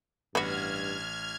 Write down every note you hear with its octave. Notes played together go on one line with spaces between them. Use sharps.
A1 G2 B3 F#4 F6 G#6